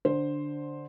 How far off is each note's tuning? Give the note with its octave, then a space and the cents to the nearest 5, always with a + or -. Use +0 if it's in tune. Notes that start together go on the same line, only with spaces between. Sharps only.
D3 +0 C5 +5